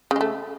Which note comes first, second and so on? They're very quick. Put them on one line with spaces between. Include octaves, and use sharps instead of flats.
C#3 G#3 A3